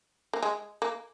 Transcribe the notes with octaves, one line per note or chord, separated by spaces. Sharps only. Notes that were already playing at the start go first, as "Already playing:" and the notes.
A#3
G#3
A#3